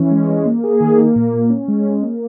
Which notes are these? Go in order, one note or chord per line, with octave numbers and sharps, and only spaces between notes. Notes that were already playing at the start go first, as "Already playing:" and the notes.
Already playing: E3 C#4
G#3
G#3
A#3
G#4
D#3
A#3
A#2
A#2
C#4
G#3
G#3
A#3